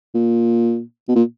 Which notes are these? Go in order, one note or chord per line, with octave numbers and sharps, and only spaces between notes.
A#2
B2
A#2